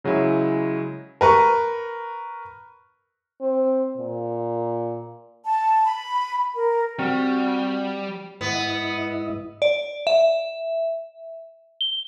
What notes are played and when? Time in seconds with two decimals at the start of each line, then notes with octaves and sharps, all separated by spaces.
0.04 C#3 F#3 G#3 E4
1.21 A#4 B4 C#6
3.41 C4
3.98 A#2
5.45 A5
5.84 B5
6.54 A#4
6.99 G3 C4 F#4
8.41 G#2 B3 E4 D#5
9.62 D5
10.07 E5
11.81 G7